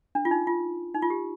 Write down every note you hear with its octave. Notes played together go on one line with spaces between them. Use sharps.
D4
F4
D#4
F4
D#4
F4
G4